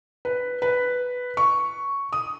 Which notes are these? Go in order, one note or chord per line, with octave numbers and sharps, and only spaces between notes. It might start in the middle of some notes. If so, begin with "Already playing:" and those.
B4
B4
C#6
D#6